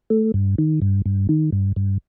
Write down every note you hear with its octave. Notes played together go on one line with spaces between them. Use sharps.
A3
G2
D#3
G2
G2
D#3
G2
G2